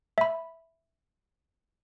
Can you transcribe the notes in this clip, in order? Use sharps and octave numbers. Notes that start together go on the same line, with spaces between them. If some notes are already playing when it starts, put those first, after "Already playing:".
E5 B5